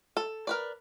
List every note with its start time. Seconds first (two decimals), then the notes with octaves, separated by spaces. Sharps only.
0.17 A4
0.47 A#4 B4 D5